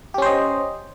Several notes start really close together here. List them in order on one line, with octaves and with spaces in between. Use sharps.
G4 C#4 C5 D#5